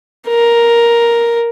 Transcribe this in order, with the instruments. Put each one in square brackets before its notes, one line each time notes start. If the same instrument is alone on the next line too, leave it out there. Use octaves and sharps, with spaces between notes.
[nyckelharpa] A#4